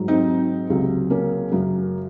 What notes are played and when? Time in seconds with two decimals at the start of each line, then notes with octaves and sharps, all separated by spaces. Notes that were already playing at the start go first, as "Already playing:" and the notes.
Already playing: G#2 F#3
0.08 C4 D#4
0.70 C#2 C3 F#3
1.10 A#3 C#4
1.52 F#2 C#3 F#3